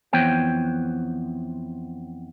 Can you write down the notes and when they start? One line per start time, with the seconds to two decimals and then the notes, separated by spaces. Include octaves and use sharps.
0.13 F2 E3 B3 C5 C#5 G5